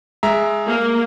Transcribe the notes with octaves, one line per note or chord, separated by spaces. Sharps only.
G#3 E5 A#5
A#3